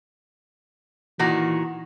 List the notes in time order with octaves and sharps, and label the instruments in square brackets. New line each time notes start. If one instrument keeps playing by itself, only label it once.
[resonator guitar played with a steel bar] A#2 D#3 F#4 [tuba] E3